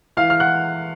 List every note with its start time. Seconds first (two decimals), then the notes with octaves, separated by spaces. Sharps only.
0.17 E3 F5 F6
0.30 F6
0.40 F#5 F#6